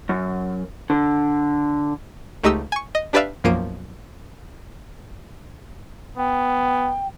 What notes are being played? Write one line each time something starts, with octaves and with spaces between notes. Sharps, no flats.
F#2
D3
C#2 A3 D#4 G4 D#6 E6
G#5 C#6
D#5
D4 G4 B4 D5 E5 F5
B1 F#2 F3 A#3 D7 D#7
B3 G5